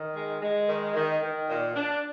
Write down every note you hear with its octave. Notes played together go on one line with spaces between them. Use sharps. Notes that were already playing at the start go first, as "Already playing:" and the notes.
Already playing: D#3
G#3
G#3
D#3
D#3
D#3
A#2
D4